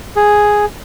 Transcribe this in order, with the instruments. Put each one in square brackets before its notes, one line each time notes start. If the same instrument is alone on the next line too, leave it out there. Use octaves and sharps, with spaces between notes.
[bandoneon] G#4